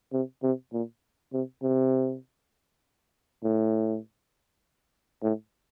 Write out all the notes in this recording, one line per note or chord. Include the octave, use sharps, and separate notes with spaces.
C3
C3
A#2
C3
C3
A2
A2